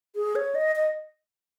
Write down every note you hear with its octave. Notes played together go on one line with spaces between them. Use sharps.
G#4
C#5
D#5
D#5